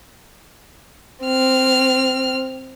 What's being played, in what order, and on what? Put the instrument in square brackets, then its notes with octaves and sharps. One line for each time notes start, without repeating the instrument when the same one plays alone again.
[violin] C4 F6